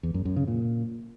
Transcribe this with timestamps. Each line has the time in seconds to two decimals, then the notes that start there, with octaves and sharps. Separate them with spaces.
0.03 E2
0.14 F#2
0.25 F#2
0.36 C#3
0.47 A#2